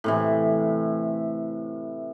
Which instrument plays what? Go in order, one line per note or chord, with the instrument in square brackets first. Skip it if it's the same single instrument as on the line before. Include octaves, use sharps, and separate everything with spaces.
[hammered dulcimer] A2 C3 E3